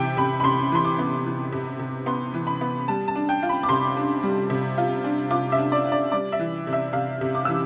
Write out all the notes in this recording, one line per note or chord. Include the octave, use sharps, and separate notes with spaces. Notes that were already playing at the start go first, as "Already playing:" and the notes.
Already playing: C3 E3 G5
C3 B5
B5
C3 C6
E3 C6
D6
B3
E3
C3
C3
B3 C6
E3
B5
B3
G3 A5
A5
D4
G5
F4
B5
D6
C3 C6
D4
G3
C3
F4
D4
F4 D6
E5
D4
D5
D4
D5
G3 D5
E5
E3
C3
E5
C3 F5
C3
D6
E3 E6